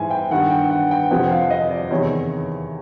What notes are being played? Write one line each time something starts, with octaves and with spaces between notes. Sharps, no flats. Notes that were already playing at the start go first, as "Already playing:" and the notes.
Already playing: G#2 E3 G#5
G5
G2 D#3 F#5
G5
F#5
G5
F2 C3 F3 F#5
F5
D#5
D5
E2 C3 D#3 C#5